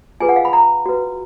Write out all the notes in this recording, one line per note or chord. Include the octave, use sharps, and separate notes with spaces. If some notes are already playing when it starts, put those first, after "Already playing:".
F4 G#4 B4 G#5
F#5
F5
B5
A#5
F#4 B4